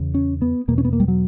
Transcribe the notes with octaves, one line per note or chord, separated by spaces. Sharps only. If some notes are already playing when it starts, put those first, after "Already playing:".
Already playing: E2 C#3
C#4
B3
E2 B2 A#3
C#4
B3
A#3
G3
F#3